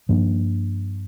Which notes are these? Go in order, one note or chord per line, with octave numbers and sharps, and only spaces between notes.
G2 F3 A#3 D4